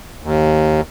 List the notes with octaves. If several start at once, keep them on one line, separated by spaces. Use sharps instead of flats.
D#2